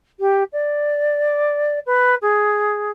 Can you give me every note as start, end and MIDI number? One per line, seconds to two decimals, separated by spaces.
0.20 0.44 67
0.53 1.79 74
1.86 2.15 71
2.22 2.91 68